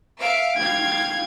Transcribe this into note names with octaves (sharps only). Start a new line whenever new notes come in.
E5 F5 D7
F5 G5 G#6